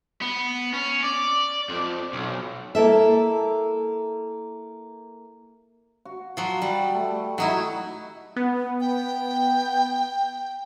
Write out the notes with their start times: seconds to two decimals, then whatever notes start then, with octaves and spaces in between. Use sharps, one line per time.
0.22 B3
0.74 C#4
1.03 D5
1.69 F2
2.13 B1
2.75 A#3 E4 A4 E5
6.05 F#4
6.37 F3 F#3
6.62 G3
6.95 A3
7.38 F#3 D#4 E4
8.36 B3
8.80 G5